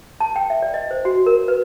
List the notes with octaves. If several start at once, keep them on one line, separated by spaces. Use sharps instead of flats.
A5
G5
E5
D5
D#5
C5
F#4
A#4
B4